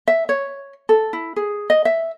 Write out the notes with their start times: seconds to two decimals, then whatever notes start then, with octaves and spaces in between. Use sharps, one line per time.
0.08 E5
0.29 C#5
0.89 A4
1.13 E4
1.36 G#4
1.70 D#5
1.85 E5